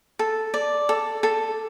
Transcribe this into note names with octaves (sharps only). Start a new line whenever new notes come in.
A4
D5
A4
A4